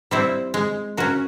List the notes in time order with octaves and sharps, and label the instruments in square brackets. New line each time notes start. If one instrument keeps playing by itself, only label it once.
[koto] G3 C4 E4
G#3
C#4 F#4 A#4